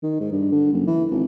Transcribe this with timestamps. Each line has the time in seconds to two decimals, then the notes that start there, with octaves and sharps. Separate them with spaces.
0.03 D#3
0.20 G#2
0.32 G2
0.52 D3
0.73 F#1
0.87 E3
1.11 G#1